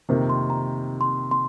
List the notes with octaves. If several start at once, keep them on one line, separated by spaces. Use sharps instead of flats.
F2 C3 D#3 A#3 D#4 C5
C6
A#5
C6
C6